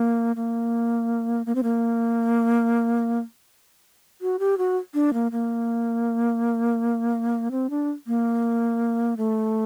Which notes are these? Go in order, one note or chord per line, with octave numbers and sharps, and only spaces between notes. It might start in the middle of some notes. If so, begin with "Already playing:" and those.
Already playing: A#3
A#3
A#3
C4
A#3
F#4
G4
F#4
D4
A#3
A#3
C4
D4
A#3
A3